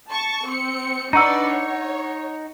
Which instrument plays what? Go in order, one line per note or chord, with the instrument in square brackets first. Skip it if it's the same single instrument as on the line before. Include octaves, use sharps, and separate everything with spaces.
[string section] A5 C#6
C4 C#7
[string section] D4 B4 D5 [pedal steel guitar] D#4 F#5 [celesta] A#5 C#6 E6
[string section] C#5